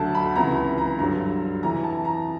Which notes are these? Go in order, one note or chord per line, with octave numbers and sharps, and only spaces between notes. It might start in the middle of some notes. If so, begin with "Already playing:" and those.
Already playing: D2 D3 F#3 A5
B5
C#2 C3 E3 A#5
B5
A#5
G2 D3 F#3 A#5
F2 C3 E3 A#5
A5
A#5